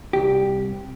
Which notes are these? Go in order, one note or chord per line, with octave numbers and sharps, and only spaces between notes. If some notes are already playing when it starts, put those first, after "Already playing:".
C2 G4